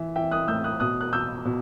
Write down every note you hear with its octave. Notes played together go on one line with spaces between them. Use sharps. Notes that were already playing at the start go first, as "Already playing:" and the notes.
Already playing: E3 E5
E3 E5 G5
D#6 F#6
A2 E6 G6
D#6 F#6
B2 D#6 F#6
F#6
B2 E6 G6
B2